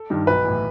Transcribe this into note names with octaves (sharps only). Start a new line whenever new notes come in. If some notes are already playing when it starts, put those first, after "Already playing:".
Already playing: A4
G2 D#3
B1 B4
A2 E3